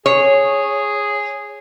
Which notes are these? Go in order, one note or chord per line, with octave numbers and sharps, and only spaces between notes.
G#4 C#5